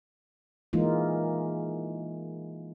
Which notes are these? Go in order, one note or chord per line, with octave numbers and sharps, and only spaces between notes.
E3 G#3 A#3 D#4 F4